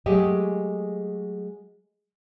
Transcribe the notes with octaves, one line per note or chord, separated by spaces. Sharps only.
F#3 G#3 A3 G4 G#4 D#5